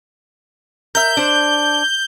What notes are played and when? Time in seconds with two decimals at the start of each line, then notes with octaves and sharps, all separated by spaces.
0.95 A#4 E5 G6
1.17 D4 C5